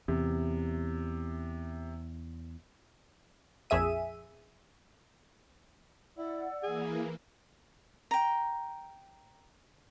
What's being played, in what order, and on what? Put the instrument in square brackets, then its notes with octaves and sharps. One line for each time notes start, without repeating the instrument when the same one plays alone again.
[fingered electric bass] E2 [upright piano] C3
[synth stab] A#1 F2 G#4 E5 D#7
[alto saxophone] E4 [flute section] D5 F#5 E6
[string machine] E3 A#3 [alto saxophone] G#4
[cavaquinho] G5 A#5